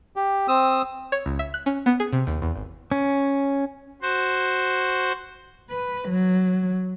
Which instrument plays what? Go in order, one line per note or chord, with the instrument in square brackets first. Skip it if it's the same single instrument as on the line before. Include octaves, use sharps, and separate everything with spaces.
[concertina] G4
C4 D#6 E6
[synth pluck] C#5
C#2
E5
F#6
C#4
B3
G#4
C3
D#2
E2
G#1
[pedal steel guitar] C#4
[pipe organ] F#4 C5
[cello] B4
F#3